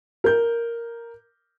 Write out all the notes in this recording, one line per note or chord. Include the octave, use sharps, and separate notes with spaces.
A#4 G6